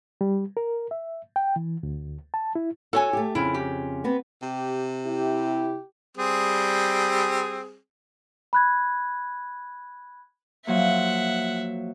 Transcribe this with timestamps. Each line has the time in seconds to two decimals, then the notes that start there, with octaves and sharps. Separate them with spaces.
0.21 G3
0.57 A#4
0.91 E5
1.36 G5
1.56 E3
1.83 D2
2.34 A5
2.55 E4
2.93 F#4 A4 C#5 G#5
3.13 A3 G4
3.35 F2 C#3 E4
3.54 G4
4.04 B3 C4
4.42 C3 G4
5.06 E4 G4
6.17 G3 C4 G#4
8.53 B5 F#6 G#6
10.67 F3 F#3 A#3 E5 F#5